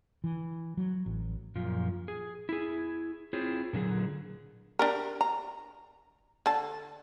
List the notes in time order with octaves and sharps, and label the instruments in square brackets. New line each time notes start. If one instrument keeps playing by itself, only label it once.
[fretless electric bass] E3
F#3
A1
[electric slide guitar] F#2 A#2 F3
G#4
E4 G#4
C4 E4 F4 G#4 C5 C#5
A#2 D3 F#3 G#4
[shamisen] D4 G4 A#4
A#5
D3 A5